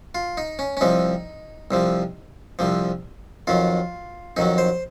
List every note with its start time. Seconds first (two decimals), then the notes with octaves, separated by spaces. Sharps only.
0.15 F4
0.37 D#4
0.59 C#4
0.77 C#4
0.81 C2 C3 F3 D#4
1.71 C2 C3 F3
2.59 C2 C3 F3
3.47 F2 D#3 F#3 F4
4.36 F2 D#3 F#3 D#4
4.58 C5